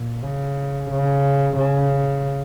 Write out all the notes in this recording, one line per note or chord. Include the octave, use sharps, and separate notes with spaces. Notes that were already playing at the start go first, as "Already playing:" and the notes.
Already playing: A#2
C#3
C#3
C#3